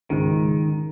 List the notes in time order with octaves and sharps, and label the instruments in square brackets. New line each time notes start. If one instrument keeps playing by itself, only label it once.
[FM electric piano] C#2 G#2 [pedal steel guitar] D#3